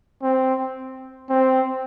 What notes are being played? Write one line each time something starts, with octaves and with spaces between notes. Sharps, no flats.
C4
C4